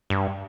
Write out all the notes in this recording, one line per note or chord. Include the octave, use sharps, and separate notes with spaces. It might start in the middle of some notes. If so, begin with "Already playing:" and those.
G2